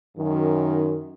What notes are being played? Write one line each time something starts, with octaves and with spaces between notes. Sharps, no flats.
F#2 D#3